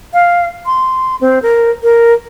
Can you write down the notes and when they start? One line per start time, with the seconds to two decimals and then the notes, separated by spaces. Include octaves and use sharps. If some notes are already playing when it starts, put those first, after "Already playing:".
0.14 F5
0.66 C6
1.21 C4
1.42 A#4
1.83 A#4